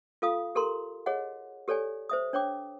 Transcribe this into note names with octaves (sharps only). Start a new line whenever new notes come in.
F4 A4 F5 D#6
G4 A4 A#4 A#5 C6
G#4 C#5 D#5 F#5
G4 A4 C#5 D5 G#5
C5 E5 D#6
D4 C#5 G5 D6